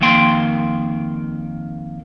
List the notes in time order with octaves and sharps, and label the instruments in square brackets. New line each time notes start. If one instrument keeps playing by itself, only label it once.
[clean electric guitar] F2 D#3 A#3 G5 C6